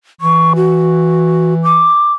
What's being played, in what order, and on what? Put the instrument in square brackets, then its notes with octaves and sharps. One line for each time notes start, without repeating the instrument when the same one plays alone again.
[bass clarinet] E3 [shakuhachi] C#6
[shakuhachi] F#4
D6